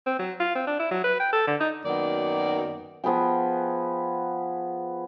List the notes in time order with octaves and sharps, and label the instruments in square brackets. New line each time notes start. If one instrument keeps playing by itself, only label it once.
[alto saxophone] C4
F#3
F4
C4
D4
E4
F#3
B4
G5
A4
D3
D#4
[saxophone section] F#2 D#3 F#3 A#3 B3 D5
[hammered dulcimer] F3 B3 G#4 G5